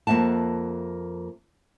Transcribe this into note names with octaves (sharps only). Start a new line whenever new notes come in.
F2 A#3 E5 F#5 A5